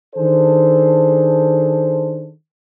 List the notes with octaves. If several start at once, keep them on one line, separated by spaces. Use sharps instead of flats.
D#3 D4 G#4 A4 C5